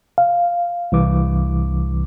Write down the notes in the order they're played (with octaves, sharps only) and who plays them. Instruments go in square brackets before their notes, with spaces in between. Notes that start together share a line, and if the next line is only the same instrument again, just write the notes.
[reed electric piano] F5
[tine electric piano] C2 E3 D6